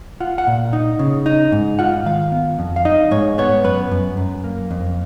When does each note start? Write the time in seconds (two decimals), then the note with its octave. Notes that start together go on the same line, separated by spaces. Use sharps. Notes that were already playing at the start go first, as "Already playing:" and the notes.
0.20 F4 F#5
0.38 F#5
0.47 A#2
0.73 D#4
0.99 C#3
1.26 D#4
1.52 G#2
1.79 F4 F#5
2.06 D#3 F5
2.32 B3
2.59 F2
2.76 F5
2.85 D#4 D#5
3.11 G#2 C#5
3.38 B3 C#5
3.64 F#2 B4
3.91 F#2
4.17 F#2
4.44 A#3
4.71 F2